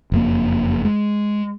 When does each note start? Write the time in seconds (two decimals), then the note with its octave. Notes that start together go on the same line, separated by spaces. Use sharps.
0.12 F#1 F2 A#3
0.85 G#3